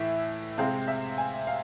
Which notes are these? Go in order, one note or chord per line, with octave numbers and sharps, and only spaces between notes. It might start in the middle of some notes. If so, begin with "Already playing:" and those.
Already playing: A2 E3 E5
C3 G#3 C4 F5
E5
G#5
F5